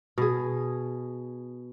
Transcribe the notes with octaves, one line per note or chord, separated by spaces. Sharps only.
B2 G#4